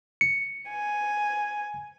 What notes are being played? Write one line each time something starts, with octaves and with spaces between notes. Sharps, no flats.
C#7
G#5